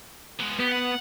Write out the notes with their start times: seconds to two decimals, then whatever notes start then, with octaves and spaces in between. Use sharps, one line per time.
0.40 G#3 B3
0.60 B3 G4
0.72 F#5